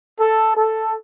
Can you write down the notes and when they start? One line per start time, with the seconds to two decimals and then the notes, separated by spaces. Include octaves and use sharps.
0.20 A4
0.56 A4